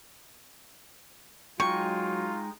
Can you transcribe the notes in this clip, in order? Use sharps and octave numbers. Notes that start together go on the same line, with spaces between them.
F#3 G#3 D#4 F4 G5 C#6